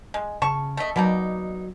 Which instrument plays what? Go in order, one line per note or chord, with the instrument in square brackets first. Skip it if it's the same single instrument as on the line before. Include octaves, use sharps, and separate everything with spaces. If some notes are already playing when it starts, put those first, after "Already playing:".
[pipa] G#3
[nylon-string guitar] C#3 [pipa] A5 C#6
[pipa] A3 D#5
[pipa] B2 A#3 D#4 [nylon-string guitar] F#3 D5